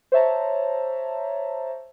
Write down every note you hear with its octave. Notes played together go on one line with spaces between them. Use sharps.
C5 C#5 E5 A5 A#5